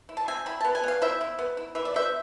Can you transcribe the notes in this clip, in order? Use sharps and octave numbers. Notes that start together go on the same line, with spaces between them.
E4
A5
C4 E5 G#5
E4 B5
B3 A5
G#5
B3 F5
E4 C5 E5
E4
B3
E4
E3 E5
D5
B3 C5 E5